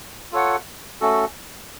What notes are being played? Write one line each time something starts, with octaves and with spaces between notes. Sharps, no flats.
F4 A4 C#5 F#5
A3 C#4 F#4 A4